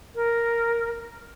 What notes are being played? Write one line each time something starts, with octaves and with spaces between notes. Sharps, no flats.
A#4